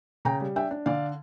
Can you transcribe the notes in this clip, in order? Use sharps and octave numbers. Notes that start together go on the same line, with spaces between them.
C#3 G5 A#5
G3
D4 E5 G5
D4
D3 D5 F5